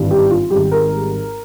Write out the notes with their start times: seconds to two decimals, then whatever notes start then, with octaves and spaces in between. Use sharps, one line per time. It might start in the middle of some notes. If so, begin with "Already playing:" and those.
Already playing: G#1 G2 E3 G3
0.11 G4
0.30 F4
0.50 G#1 G#2 G3 G4
0.72 A#4